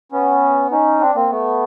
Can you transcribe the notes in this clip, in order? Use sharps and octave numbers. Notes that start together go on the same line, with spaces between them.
B3 C#4
C#4 D#4
C4 D4
A#3 C4
A3 B3